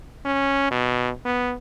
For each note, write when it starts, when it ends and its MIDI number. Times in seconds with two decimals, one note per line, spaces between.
0.25 0.66 61
0.71 1.10 47
1.25 1.53 59